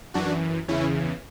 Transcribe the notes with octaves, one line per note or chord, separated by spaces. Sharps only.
F#2 E3 D4 F#4
E2 C#3 E3 C#4 E4